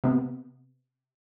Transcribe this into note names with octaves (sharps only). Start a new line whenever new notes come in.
C3 B3